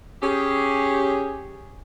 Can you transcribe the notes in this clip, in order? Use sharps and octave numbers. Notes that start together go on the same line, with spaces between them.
C#4 G4 G#4